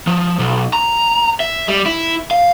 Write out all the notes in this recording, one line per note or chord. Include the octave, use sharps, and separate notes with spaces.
F3
B1
A#5
E5
G3
E4
F5